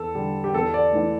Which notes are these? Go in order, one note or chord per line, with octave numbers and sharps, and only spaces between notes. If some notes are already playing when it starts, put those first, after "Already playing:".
Already playing: E2 A4
D3 G3
G4
E2 A4
D5
E3 A3